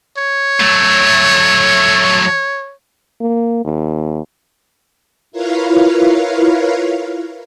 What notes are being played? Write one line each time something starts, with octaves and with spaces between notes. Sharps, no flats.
C#5
F#3 A3
A#3
D#2
E4 F4 A#4 B4 C#5 F5